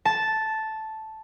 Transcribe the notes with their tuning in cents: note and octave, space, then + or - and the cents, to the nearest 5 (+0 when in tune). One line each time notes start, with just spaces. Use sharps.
A5 -5